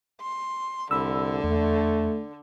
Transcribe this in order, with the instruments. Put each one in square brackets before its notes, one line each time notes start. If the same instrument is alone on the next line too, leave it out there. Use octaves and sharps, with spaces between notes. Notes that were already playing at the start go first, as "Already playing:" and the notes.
[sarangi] C6
[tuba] C2 [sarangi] D3 [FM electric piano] B5 E6
[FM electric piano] E2 [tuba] A3